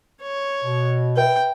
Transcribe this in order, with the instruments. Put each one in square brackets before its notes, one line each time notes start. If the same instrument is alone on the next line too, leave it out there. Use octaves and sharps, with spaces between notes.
[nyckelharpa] C#5
[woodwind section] B2
[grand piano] B4 E5 [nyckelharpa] G5